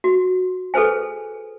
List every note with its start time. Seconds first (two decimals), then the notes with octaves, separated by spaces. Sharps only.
0.04 F#4
0.74 G#4 A4 B4 C5 G#5